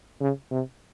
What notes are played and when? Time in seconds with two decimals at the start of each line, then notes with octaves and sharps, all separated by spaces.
0.21 C#3
0.51 C3